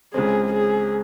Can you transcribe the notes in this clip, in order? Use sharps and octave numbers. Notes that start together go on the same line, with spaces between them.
C#2 C#3 G#3 C4 G#4
G#4